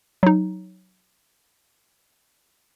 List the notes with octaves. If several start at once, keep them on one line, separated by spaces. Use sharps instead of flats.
F#3 D#4